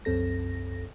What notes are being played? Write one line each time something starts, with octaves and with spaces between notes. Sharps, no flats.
C2 F#2 C4 A4 A#6